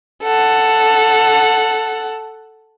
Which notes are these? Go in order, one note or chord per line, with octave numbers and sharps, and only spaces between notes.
A4 F#5